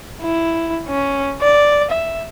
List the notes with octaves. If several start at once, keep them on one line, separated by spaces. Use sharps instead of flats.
E4
C#4
D5
E5